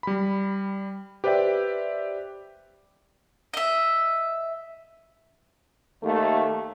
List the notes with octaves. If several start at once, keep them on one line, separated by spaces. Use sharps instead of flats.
G3 B5
G4 B4 C5 D5 E5 G5
D#5 E5
D#2 A3